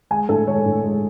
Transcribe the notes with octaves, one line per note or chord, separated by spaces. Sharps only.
G#3 G#5
A2 A4
G#3 C#5
A2
G#3